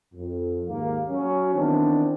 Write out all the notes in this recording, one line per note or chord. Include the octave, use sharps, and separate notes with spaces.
F2
D#2 G#2 A#3
F#3 C#4
D#3 E3 B3 C4 D4